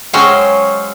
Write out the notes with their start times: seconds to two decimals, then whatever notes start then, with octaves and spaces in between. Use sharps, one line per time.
0.13 F#3 G#3 C#4 C5 F5 G5